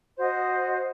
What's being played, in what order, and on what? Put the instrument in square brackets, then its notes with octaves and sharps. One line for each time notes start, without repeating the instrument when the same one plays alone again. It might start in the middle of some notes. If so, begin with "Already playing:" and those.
[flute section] F#4 C5 D#5